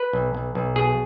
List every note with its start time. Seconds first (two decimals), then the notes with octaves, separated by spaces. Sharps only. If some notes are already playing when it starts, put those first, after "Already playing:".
Already playing: B4
0.13 B1
0.35 B1
0.55 B1
0.76 B2 G#4